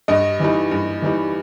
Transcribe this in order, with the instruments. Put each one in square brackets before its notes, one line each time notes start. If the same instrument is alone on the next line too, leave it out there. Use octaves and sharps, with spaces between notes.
[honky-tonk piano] G2 D#5
E3 G3 D#4
G2
E3 G3 D#4